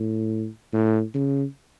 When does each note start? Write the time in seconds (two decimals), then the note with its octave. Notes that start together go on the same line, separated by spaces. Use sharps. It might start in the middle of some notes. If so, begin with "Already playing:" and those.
Already playing: A2
0.73 A2
1.14 C#3